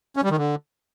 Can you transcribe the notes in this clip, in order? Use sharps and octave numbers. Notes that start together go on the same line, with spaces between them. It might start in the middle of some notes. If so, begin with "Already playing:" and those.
C#4
G3
D#3
D3